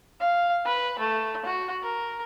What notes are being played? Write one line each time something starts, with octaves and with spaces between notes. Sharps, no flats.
F5
B4
A3
F#4
A#4